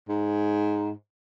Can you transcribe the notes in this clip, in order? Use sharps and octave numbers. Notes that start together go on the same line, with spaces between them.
G#2